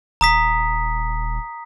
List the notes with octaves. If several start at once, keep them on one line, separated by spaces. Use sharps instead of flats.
D#1 A#5 D#6 B6